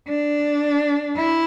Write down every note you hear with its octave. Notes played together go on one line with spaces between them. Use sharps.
D4
E4